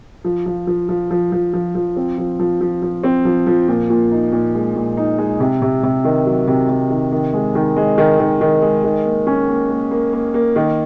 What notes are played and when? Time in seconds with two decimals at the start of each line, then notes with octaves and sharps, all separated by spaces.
0.24 F3
0.46 F3
0.67 F3
0.89 F3
1.11 F3
1.32 F3
1.53 F3
1.75 F3
1.96 C4
2.18 F3
2.39 F3
2.61 F3
2.82 F3
3.03 C4
3.25 F3
3.47 F3
3.68 A#2
3.90 A#2
4.11 D#4
4.32 A#2
4.54 G#3
4.76 A#2
4.97 D#4
5.18 G#3
5.40 C3
5.62 C3
5.83 C3
6.04 D#3
6.26 F#3
6.47 C3
6.69 C3
6.90 D#3
7.12 D#3
7.33 G#3
7.55 D#3
7.76 G#3
7.98 D#3
8.19 D#3
8.41 D#3
8.62 G#3
8.84 D#3
9.05 A#3
9.27 C#4
9.48 A#3
9.70 A#3
9.91 A#3
10.13 A#3
10.34 A#3
10.56 D#3